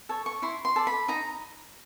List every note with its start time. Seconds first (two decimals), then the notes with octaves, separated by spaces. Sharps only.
0.09 A4 C#5
0.26 C#6
0.42 E4 C6
0.65 C6
0.76 A4 D5
0.87 B5
1.08 D#4 A#5